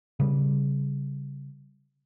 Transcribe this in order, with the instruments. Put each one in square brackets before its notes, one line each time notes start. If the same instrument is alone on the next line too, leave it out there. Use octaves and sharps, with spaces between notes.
[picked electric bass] C#3 G3